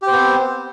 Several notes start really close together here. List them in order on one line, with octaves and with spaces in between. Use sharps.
G4 C5 B3 C4